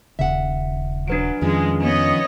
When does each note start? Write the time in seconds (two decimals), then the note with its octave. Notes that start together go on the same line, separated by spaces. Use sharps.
0.19 D#1 C#3 E5 F#5
1.08 F#3 D4 B4 D7
1.41 F2 D#3 F3 G#3 C#4
1.82 B3 C#5 D#5